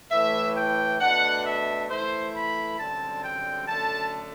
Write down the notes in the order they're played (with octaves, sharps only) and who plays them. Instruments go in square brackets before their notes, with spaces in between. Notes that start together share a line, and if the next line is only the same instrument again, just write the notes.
[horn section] A2 E3 A3 E5
G5
B2 A3 D4 F#5
E5
E3 A3 E4 C5
B5
F#2 D3 G3 C4 A5
G5
F#2 D3 A3 A5